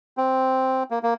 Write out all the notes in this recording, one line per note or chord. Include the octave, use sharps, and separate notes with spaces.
C4
A#3
A#3